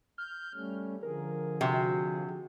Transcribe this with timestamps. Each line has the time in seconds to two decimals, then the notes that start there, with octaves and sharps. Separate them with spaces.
0.18 F6 G6
0.55 G3 A3 C#4
1.03 D3 F3 G#4 A#4
1.61 C3 F#4